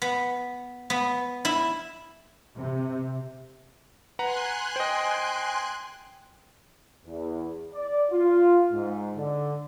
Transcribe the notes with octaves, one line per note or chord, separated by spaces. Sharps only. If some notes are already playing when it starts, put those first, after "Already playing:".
B3
B3
E4
C3
B4 F#5 G#5 A#5 C6 F#6
C5 D#5 G5
E2
D5
F4
G#2
D3